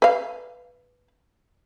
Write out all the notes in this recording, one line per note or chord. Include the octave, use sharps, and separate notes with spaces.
B4 F5